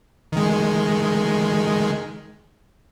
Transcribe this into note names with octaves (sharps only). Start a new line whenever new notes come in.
D#3 G#3